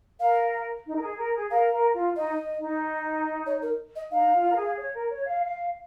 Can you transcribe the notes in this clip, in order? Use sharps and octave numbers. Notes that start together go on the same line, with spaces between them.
A#4 F5
D#4
A#4
G#4
A#4
G#4
A#4 F5
A#4
F4
D#4 D#5
D#4
C#5
A#4
D#5
D#4 F5
F4
A#4
G#4
C#5
A#4
C#5
F5
F5